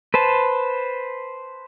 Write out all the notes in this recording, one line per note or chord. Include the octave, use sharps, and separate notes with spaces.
B4 C5 A5